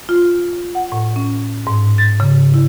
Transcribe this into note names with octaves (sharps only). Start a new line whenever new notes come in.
F4
F#5
A2
C#4
G#2
A6
C#3
E4